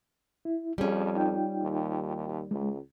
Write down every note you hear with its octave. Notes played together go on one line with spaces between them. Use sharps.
E4
F2 G3 C#4 G#4
D#4 F4 G5
D#2
C#2 G#3